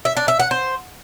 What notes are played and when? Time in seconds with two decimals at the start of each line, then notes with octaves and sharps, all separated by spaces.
0.05 E5
0.17 D4
0.28 E5
0.39 F#5
0.51 C5